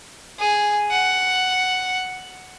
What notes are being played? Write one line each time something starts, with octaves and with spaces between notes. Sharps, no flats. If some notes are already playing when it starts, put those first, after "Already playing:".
G#4
F#5